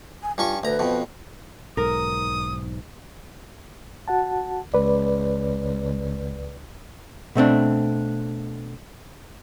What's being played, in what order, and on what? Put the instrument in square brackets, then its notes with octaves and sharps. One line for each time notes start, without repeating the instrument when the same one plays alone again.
[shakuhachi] G#5
[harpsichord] G2 C#4 C#6 [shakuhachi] F4
[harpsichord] D2 A#5 [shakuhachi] B4
[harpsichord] F2 B2
[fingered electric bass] B1 G#2 [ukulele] A#4 [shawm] D#6
[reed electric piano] F#4 F#5 A5
[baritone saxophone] C#2 [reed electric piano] B4 D5
[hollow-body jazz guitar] B2 A3 C4 D4